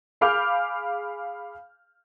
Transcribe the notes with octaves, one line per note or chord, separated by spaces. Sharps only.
G#4 F5 B5 D6 F6 G6